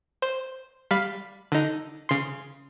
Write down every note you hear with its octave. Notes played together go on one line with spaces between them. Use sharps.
C5
G3 F5 B5
D3 D#4
C#3 C6